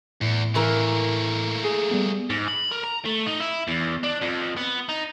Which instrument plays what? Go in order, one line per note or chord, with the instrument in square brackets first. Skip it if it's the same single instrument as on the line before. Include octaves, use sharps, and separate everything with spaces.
[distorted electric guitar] E2 [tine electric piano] A2
[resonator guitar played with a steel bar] E3 A#4 [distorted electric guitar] A3 A#3
[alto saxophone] G#4
[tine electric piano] G3 B3
[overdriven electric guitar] G#2
B5
A#4
A#5
A3
D#4
E4
E2
D4
F2
B3
D#4